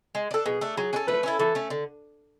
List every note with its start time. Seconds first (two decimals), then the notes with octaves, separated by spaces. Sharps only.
0.15 G#3
0.31 D4 A4
0.46 B2 G#4
0.61 A3 D4
0.77 F#3 G#4
0.93 C#4 F#4
0.96 A4
1.08 A3 B4
1.23 C#4 E4 A4
1.39 E3 A4
1.55 A3 C#4
1.70 D3